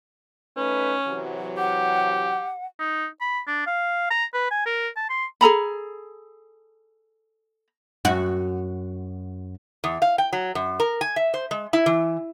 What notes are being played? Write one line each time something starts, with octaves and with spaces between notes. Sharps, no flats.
A3 C#4 D#4 B4
C3 E3 F#3
G4 F#5
D#4
B5
D4
F5
A#5
B4
G#5
A#4
A5
C6
G#4 A4 A#5 B5
F#2 F#4
E2
F5
G5
F#3
F#2
A#4
G#5
E5
C5
G#3
E4
E3